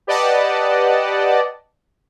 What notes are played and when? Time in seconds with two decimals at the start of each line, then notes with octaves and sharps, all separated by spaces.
0.07 G4 B4 D5 D#5 F#5 A5